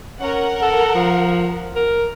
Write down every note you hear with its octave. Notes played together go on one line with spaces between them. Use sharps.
C#4 A#4 F#5
A4
F3
A#4